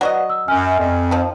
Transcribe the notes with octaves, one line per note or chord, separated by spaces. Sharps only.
F#3 F#4 B4 D5 D#5 F#5
E6
F#2 G#5 F6
F2
D#3 F3